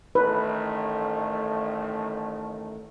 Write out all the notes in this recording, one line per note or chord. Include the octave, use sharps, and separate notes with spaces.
A1 D#3 A3 B4